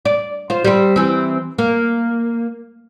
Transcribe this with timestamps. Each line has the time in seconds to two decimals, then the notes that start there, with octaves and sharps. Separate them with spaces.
0.05 D5
0.50 F4 C5
0.65 G3 C4
0.96 E3 C4
1.58 A#3